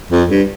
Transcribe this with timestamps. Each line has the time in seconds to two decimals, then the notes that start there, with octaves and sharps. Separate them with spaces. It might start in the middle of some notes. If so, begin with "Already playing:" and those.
0.11 F2
0.30 G2